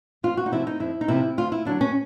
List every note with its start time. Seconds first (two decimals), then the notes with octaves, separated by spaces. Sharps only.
0.23 F2 F4
0.37 F#4
0.46 D#4
0.52 C3 F3 E4
0.67 D#4
0.80 F2 E4
1.01 D#4
1.08 C3 F3 E4
1.37 D2 F4
1.52 E4
1.65 D3 F#3 D4
1.81 C#4